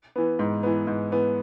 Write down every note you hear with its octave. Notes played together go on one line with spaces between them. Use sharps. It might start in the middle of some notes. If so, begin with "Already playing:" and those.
E3 B3
G#2
E3 B3
G#2
E3 B3